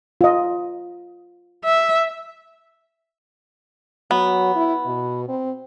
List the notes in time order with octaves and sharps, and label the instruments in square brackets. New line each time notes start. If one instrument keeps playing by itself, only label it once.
[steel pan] F4 D#5
[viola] E5
[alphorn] F#3 [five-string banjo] B3
[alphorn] E4
B2
C4